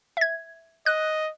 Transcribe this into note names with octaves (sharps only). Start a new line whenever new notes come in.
E5 G#6
D#5 F#6